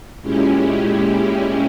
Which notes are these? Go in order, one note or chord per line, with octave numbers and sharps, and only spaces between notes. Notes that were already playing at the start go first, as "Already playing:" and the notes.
A#2 G#3 C#4 E4 G4